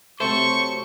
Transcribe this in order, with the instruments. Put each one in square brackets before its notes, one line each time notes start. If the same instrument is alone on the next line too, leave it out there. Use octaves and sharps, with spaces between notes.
[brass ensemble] C3 F#3 C4 [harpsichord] A3 [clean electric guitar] C5 [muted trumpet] C#6